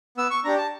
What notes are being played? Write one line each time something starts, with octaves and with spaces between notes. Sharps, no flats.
B3 E6
C#6
D4 G4 A#5
A5